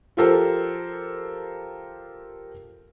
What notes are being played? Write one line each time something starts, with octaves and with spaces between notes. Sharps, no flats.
F3 F4 G4 A4 A#4 C5